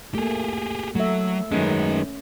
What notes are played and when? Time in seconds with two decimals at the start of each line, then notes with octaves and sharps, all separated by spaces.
0.14 A3 A#3 G4 G#4
0.95 F#3 A3 E5
1.52 F#2 D#3 G#3 A3 C#4 B4